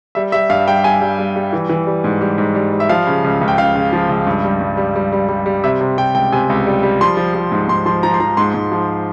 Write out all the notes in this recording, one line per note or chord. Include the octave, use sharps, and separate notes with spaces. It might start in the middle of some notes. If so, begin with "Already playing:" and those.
G3 E5
G3 E5
G2 F5
G3 G5
G3 G#5
G3
G3
G3
E3
E3
G3
G#2
G3
G#2
G3
G3
E5
F3 F5
C#3
C#2
C#2
G5
C#3 F5
C#3
F3
C#2
G2
G3
G2
G3
G3
G3
G3
G3
C3 E5
C3
C3 G5
C#2 G5
C3 G#5
C#2
G3
G3
F3 C6
F3
F3
G#2
G#2 C6
F3 C6
F3 A#5
C6
F3 A#5
G#2 C6
G#2
F3